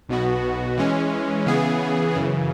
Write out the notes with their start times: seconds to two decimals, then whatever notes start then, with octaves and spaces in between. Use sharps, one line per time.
0.09 B1 B2 B3 F#4
0.78 E3 G#3 C#4
1.46 C#3 E3 B3 G#4
2.14 F#2 C#3 E3